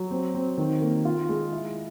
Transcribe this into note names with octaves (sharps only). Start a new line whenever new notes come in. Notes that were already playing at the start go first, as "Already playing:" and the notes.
Already playing: F#3
C4
C4
D#3
A#3
F4
G#3
E4